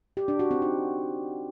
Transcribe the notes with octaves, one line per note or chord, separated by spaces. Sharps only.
G4
D4
F#4
C4
D#4